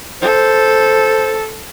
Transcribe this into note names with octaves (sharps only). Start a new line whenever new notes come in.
A4 C5